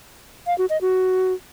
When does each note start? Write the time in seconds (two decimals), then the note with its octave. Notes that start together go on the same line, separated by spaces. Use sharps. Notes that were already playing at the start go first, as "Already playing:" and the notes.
0.47 F5
0.58 F#4
0.70 D#5
0.81 F#4